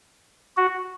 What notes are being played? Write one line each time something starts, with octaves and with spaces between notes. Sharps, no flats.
F#4